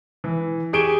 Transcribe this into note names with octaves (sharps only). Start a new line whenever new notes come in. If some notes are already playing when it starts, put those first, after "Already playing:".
E3
G4 G#4 C#6 D7 E7 G7